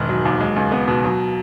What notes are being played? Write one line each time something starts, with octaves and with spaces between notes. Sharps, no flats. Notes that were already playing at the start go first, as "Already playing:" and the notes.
Already playing: E1 G#2 D#3
F#3
D#2
G#3
C#2
B3
B2
F#3